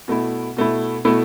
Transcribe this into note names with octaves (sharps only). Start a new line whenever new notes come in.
B2 A3 E4
B2 A3 E4
B2 A3 E4